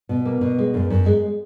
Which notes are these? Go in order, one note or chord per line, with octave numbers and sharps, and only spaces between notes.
B2
A#3
B2
G#3
F#2
F#2
G#3